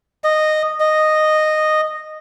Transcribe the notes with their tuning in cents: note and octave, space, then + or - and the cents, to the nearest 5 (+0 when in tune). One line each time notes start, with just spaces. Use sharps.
D#5 -10
D#5 -10